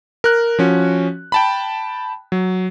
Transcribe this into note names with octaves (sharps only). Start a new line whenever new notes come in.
A#4 F#6
F3 C#4 F#4
G5 A5 B5
F#3